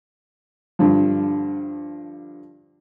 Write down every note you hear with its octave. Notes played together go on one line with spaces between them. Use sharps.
G2 D3 F3